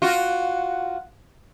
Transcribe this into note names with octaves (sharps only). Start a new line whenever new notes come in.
F4 F#4